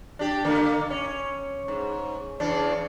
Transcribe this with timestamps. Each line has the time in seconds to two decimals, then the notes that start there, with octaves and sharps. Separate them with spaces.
0.19 D4 G4
0.45 D3 A#3
0.90 C#4
1.68 G#2
2.40 E2 C#3 D4